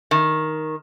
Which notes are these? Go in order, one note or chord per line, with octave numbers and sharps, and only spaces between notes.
D#3